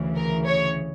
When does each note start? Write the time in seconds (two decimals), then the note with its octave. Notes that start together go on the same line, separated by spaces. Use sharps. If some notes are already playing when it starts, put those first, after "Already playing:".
Already playing: D2 C#3 E3
0.15 A#4
0.45 C#5